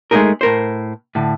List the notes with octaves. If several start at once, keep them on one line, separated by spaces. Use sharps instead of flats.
G#3 A3 C4 D#4 G#4 A#4
A2 A#4 C5
A2 D3